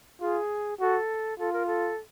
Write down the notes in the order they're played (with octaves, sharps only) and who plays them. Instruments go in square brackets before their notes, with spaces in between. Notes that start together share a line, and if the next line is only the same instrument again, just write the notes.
[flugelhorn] F4 [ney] G#4
[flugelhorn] F#4 [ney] A4
[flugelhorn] F4 [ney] A4
[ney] A#4
A4